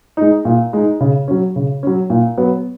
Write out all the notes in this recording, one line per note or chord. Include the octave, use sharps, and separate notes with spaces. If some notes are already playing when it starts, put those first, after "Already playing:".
G#3 D#4
A#2
G#3 D#4
C#3
F#3 C#4
C#3
F#3 C#4
A#2
F#3 B3